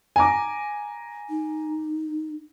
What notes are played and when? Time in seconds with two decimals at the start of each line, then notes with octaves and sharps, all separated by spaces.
0.16 G#5 A#5 D6
1.30 D#4